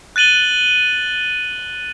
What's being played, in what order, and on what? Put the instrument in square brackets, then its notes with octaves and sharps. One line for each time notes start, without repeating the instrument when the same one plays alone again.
[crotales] F#6 A6 D#7 F#7 G7